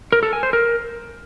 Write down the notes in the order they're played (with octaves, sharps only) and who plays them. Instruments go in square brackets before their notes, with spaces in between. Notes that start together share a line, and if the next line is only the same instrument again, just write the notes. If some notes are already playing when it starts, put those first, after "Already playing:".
[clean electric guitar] A#4
A4
G#5
C5
A#4